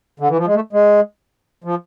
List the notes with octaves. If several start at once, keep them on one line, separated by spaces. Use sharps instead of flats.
D3
E3
F3
G#3
A3
G#3
F3